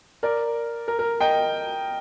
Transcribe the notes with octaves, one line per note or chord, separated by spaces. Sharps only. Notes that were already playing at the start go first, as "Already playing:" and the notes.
A#4 D5
A#4
A#4
D#5 G5